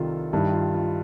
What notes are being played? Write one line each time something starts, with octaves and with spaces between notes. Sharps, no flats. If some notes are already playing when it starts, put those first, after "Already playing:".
Already playing: C2 C3 D#3 F4 A4
G2 D#3 G3 E4
F4
F4